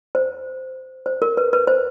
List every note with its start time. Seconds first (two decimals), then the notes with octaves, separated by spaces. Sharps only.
0.15 C5
1.06 C5
1.22 A#4
1.37 B4
1.53 B4
1.67 C5